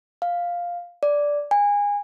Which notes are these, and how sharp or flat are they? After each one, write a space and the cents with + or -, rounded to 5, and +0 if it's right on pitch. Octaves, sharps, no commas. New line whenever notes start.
F5 +5
D5 -10
G#5 -25